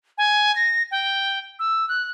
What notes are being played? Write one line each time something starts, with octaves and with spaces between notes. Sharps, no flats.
G#5
A#6
G5
E6
F#6